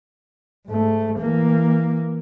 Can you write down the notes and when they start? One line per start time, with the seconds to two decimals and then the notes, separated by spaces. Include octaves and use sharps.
0.66 G#2 A3
1.19 E3 A#3